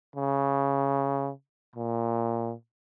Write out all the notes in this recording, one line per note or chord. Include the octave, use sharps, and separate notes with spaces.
C#3
A#2